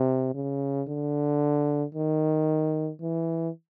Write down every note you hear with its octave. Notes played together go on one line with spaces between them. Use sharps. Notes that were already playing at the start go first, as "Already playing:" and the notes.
Already playing: C3
C#3
D3
D#3
E3